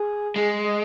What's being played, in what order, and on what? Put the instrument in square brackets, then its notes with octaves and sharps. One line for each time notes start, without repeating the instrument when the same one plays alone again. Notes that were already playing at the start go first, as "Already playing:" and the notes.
Already playing: [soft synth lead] G#4
[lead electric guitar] G#3 [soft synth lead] G#4
[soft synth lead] D#5